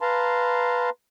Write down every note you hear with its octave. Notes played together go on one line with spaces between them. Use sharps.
B4 F5 A5 A#5 C6